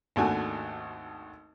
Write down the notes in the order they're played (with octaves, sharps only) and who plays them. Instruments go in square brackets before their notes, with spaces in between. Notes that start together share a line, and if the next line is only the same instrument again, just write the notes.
[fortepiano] G#1 D#2 A3 D4 F#4 G#5